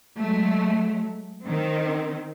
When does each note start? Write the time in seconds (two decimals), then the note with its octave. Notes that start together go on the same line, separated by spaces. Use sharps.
0.17 F#3 G#3 A3
1.44 D#3 C4